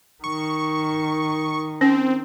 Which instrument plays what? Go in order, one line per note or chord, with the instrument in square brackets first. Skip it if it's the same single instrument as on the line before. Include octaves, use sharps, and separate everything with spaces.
[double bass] D#3 [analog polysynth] C#6
[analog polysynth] C4 [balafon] C#4